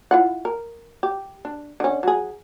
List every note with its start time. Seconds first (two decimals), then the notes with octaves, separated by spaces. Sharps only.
0.11 E4 F4 F#5
0.45 A#4
1.03 G4
1.45 D4
1.80 D3 C#4
2.03 F#3 G#4